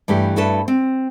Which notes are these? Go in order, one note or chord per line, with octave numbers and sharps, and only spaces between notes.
G2 E3 A3 G4
G2 E4 F#4 A4 B4 A5
C4